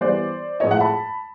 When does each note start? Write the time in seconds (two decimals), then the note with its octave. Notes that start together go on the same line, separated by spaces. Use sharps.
0.01 E3 G3 B3 C5 D5
0.60 A2 F3 G#3 C#5 D#5
0.71 E5 F#5
0.80 A5 B5